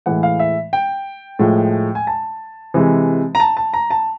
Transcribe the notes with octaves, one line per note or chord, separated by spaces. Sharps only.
A2 E3 G#3 F#5
F5
E5
G5
A2 F3 G#3
G#5
A5
C3 E3 G#3
A#5
A5
A5
A#5
A5